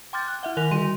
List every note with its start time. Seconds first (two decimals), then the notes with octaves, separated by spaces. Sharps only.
0.13 G5 C6 D6 F6 G6 A6
0.28 F#6
0.43 E4 E5 F#5
0.57 D#3 A#4 G#5 F#6 A#6 F7
0.71 D3 G3 F#4 C6 D#7